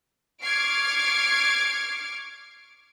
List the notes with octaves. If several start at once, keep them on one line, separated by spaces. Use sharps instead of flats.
C#6 D6 F6 G#6 C7 D7